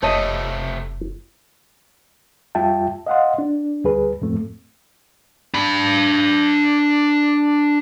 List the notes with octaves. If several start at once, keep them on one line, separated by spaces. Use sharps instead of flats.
F1 F#2 C3 A3 C5 C#5 D#5 A5
F2 G3 F4 E5 G5 A5
D#5 F5 F#5 C6
D4
D2 G3 G#4 B4
F2 A2 F3 A3 C4
D4 B5